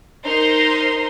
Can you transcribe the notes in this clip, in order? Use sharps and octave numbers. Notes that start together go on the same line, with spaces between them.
D#4 A#4 C5 A#5 C6